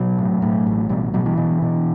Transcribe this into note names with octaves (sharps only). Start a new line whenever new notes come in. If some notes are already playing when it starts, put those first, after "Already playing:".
Already playing: B2 F#3
A2
A2
A1
B2 G3
B2 F#3
E3
B2
B2